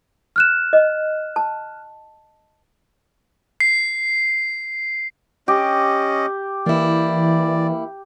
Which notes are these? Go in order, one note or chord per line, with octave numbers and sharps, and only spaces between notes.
F6 F#6 E7
D#5
A5
C7
C#4 G4 D#5
E3 A#3 E4 D5